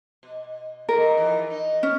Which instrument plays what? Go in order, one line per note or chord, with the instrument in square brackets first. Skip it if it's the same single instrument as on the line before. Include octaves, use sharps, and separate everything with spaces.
[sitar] B2
[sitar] A#2 D#3 [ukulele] A#4
[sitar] E3 F3
D#4
[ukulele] C#4